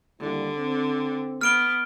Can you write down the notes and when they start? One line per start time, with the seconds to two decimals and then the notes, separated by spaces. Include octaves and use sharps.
0.20 D#2 D3 G3 E4
0.58 C4
1.41 B3 F6 D7 G7